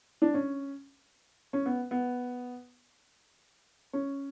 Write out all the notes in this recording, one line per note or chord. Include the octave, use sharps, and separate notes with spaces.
D4
C#4
C#4
B3
B3
C#4